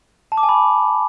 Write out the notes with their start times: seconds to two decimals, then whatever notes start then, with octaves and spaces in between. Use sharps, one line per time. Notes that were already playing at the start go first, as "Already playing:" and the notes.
0.32 A5
0.37 D6
0.43 G#5
0.49 B5
0.55 D6